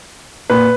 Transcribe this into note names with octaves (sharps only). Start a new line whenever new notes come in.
A#2 B4